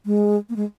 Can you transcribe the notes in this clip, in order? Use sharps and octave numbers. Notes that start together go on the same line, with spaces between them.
G#3
A#3
G#3